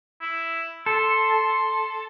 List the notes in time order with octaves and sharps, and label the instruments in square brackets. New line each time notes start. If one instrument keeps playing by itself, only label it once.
[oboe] E4
[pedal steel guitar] A4 [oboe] C6